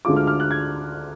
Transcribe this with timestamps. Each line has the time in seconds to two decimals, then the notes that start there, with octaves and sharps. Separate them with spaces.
0.05 D2 D3 G#3 D4 F4 D6
0.16 F6
0.27 F6
0.40 F#6
0.51 G#6